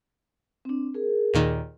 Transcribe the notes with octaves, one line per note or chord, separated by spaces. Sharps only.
C4 D4
G#4 A#4
D#2 A#2 D#3